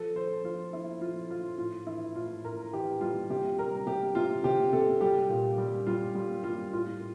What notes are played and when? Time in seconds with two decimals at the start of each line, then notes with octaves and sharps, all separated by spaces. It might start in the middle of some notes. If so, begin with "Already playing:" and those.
Already playing: F3 A4
0.15 F3 C5
0.44 F3 F4
0.73 F3 E4
1.01 F3 F4
1.31 F3 F4
1.58 A2 F4
1.87 E3 E4
2.15 A2 F4
2.44 A2 A#4
2.73 E3 G4
3.01 G3 F4
3.30 C3 G4
3.58 G3 A#4
3.87 C3 G4
4.15 C3 F4
4.44 C3 G4
4.73 C3 A4
5.01 G3 G4
5.29 A#2
5.58 G3
5.87 G3 F4
6.15 G3
6.43 G3 F4
6.73 A2 F4